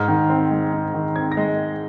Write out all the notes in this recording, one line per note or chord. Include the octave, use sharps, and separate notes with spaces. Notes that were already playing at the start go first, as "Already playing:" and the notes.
Already playing: G#2 F6
D#3
C4
G#3
G#2
D#3
C4 G#6
A#6
G#3